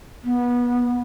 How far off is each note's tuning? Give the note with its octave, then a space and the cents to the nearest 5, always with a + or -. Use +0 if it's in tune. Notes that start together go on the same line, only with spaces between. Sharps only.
B3 -20